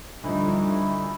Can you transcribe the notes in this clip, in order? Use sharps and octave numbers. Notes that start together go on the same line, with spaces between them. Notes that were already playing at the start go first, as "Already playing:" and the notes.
D2 F3 G3 D#4 E4